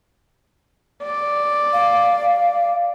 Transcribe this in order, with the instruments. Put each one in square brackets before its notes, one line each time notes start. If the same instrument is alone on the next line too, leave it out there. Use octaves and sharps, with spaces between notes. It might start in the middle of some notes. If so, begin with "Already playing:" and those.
[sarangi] D5
[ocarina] F5